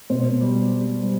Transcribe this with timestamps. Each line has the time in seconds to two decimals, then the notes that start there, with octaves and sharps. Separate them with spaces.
0.10 B2 C5
0.41 G3
0.72 G3
1.03 G3